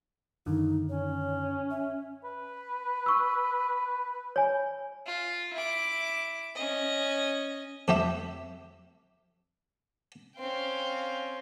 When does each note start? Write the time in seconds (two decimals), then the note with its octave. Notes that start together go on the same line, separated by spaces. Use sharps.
0.46 F#2 D3 D#3 D#4
0.89 C#4 C#5
1.70 E5
2.24 B4
3.06 C#6 E6
4.36 C#5 G#5
5.06 F4
5.54 E4 D6
6.55 C#4 D#5
7.88 F2 A3 G4 E5
10.39 C4 C#4 F5 G5